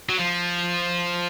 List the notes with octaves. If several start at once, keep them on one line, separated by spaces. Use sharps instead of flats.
F#3
F3